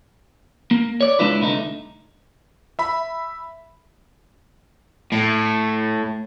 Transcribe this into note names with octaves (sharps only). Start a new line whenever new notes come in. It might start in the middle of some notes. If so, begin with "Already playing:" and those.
A#3
C#5 D5
C#2 G#3 D4 E4 F4 B4
C2 D3 A3 D#4
E5 B5
A2